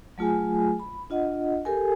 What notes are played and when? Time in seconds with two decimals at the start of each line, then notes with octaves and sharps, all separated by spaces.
0.18 F#3 A3 F4 G#4 G#5
0.80 B5
1.10 D4 F4 D#5 F#5
1.65 G4 A4 A#4 G#5